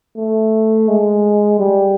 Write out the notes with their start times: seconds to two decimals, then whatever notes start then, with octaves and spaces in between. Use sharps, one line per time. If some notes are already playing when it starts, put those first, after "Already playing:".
0.17 A3
0.88 G#3
1.59 G3